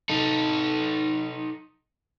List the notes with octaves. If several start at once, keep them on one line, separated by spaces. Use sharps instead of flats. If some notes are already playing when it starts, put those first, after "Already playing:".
D#4 A4